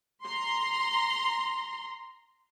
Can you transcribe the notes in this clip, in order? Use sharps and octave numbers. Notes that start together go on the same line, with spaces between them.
A#5 C6